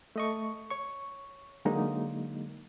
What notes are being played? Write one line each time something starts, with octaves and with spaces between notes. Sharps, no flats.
A3 D#5 C#6
C#5 C#6
D3 F#3 G#3 A#3 D#4